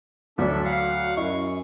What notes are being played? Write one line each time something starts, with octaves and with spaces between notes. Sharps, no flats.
D2 F#3 D4 A4 D5 E5
F5 F#5
F#2 E4 D#5 C#6